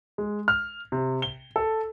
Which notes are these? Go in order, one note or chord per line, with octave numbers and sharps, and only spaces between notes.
G#3
F6
C3
G7
A4